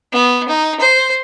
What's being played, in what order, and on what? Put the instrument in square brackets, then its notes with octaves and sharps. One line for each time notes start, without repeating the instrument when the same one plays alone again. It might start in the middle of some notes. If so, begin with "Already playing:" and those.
[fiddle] B3
D#4
C5